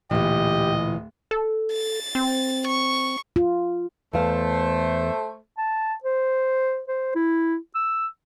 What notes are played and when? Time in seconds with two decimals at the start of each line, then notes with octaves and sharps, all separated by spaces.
0.11 D1 A#2 E3 G4 D#5
1.31 A4
1.73 A6
2.15 C4
2.67 C#6
3.36 F4
4.13 E2 A3 C5 F5
5.58 A5
6.04 C5
6.88 C5
7.15 E4
7.75 E6